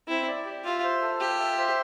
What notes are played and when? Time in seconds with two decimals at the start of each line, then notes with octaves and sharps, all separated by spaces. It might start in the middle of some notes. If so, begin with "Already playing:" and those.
0.08 C4 E4
0.28 D5
0.45 G4
0.65 F4 E5
0.83 C5
1.02 A4
1.20 F4 G4
1.39 E5
1.58 C5